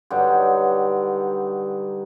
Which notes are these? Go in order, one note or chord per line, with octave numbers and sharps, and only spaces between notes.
G2 D3 F#3 D#4